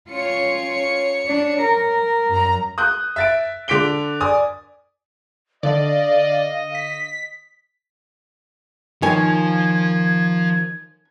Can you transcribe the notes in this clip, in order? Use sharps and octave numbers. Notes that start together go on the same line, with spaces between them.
C#4 F4 C#5 C#7
D4
A#4
F#2 A#5
D#6 F#6 G6
E5 A6 D7
D3 D6 B6 D7 G7
D5 G#5 D#6
D3 D5 D#5 F5
B6
D#3 F3 C#5 G#5 G#6